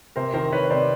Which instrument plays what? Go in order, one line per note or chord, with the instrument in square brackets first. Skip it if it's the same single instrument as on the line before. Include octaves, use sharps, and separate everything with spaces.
[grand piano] C3 A#4 C5
D#3 A#4 C5
D#3 B4 C#5
C3 C5 D5